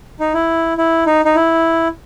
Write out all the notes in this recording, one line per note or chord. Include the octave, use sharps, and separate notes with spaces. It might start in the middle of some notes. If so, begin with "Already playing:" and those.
D#4
E4
E4
D#4
D#4
E4